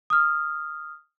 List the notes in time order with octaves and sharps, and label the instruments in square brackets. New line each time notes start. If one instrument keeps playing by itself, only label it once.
[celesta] D#6 F6